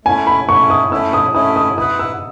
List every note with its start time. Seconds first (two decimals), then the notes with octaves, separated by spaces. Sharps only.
0.05 A3 C#4 E4 G#5
0.27 B5
0.48 A3 C#4 E4 C#6
0.70 D#6
0.91 A3 C#4 E4 E6
1.13 D#6
1.34 A3 C#4 E4 D#6
1.56 D#6
1.77 E4 B4 F#5 D#6
1.99 E6